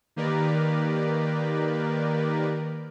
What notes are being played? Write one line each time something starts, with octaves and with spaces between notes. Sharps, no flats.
D#3 A#3 G4 A#4 B4 D5